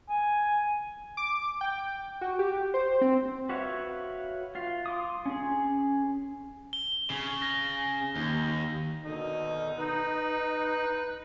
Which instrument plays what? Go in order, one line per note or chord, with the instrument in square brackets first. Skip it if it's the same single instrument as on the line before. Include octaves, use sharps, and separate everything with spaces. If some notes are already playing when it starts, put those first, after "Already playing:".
[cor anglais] G#5
[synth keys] D6
G5
F#4
G4
C5
C4
[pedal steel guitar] F#4 B4 C#5 E5 F5
F4 F5
C6 D6 D#6
C#4 G#4
[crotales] G7
[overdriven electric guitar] C#3
[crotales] A#6
[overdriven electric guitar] D#2
[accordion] B2 D3 D#3 [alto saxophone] D#4
[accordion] D#4 [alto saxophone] B4